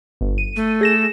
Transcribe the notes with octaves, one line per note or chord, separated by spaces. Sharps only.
G1
D#7
A3
G#4 A#6 E7